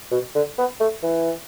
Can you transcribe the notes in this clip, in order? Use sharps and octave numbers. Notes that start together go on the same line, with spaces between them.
B2
D3
B3
A3
E3